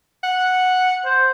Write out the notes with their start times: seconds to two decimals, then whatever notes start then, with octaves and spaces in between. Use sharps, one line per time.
0.24 F#5
1.05 C5